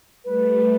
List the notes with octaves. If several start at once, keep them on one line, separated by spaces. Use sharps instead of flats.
G3 A3 B4